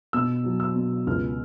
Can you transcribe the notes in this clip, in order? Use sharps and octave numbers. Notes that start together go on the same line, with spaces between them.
B2 E6
F#3
E6
B2
C#2 F6